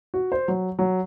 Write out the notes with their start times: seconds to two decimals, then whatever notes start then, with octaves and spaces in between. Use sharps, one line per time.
0.14 F#4
0.32 C5
0.48 F#3
0.79 F#3